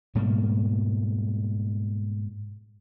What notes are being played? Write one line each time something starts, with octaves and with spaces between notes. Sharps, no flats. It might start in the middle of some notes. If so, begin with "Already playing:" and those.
G#2 B2 G3 A#3